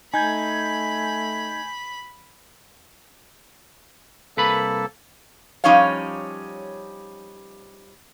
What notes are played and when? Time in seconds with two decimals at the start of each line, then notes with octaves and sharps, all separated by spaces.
0.14 A3 D#4 G#5 B5 G6 G#6
4.37 C2 A#3 A4 B4 B5
5.64 F3 G3 C#4 D#4 C#5 F5